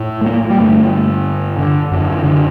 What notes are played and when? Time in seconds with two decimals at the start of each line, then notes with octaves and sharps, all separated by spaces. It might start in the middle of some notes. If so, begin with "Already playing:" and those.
Already playing: A2
0.21 A3
0.26 A#3
0.50 G3
0.59 G2 D3 A3
1.59 D3
1.91 F#2 D3
2.24 D3